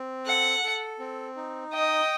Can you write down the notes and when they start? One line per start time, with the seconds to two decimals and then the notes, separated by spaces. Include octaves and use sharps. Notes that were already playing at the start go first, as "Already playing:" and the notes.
Already playing: C4
0.27 A4 F#5
0.64 A4
0.99 C4
1.37 D#4
1.72 D#5 G5